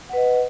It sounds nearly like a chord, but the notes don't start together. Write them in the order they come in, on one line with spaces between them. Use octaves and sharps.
F#5 B4 D#5